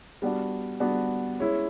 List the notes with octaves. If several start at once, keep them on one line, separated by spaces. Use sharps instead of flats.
G3 B3 D4 F#4
G3 B3 D4 F#4
G#3 C#4 E4